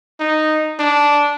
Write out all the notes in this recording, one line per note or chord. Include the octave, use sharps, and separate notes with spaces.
D#4
D4